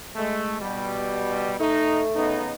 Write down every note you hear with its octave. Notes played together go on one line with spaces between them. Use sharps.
G#3 A3
B2 G3
A3 D#4
C#3 B3 D#4